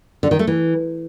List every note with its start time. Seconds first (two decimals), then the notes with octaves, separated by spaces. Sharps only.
0.23 D3
0.31 D#3
0.39 A3
0.47 E3